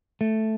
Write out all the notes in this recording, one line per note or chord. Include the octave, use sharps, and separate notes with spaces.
A3